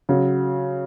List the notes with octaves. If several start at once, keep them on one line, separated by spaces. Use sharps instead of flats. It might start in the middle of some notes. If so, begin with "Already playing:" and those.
C#3 F#3